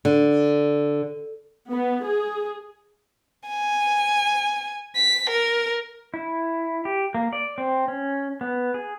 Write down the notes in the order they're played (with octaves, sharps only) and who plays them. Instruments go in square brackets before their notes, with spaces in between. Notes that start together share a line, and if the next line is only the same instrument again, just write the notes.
[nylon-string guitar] D3
[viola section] B3
G#4
[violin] G#5
B6
A#4
[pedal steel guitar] E4
G4
A#3
D5
C4
C#4
B3
G#4